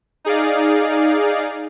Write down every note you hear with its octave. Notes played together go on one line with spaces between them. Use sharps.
D#4 G#4 D5 F5